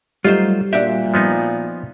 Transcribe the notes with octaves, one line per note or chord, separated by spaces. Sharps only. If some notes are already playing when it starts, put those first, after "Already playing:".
F#3 G3 A3 D#4 F4 C5
A#2 D4 F#4 G4 E5
F3 B3 D#4